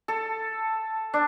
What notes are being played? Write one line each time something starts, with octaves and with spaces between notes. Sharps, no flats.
A4
D4